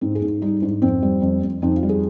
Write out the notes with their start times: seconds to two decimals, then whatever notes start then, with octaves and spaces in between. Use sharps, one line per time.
0.01 G#2 C4
0.15 G#4
0.22 G#2
0.42 G3 D#4
0.62 G#2 D4
0.82 F2 C4
1.02 G3
1.22 F2
1.43 F2
1.62 F2 D#4
1.76 F4
1.83 G3
1.89 G#4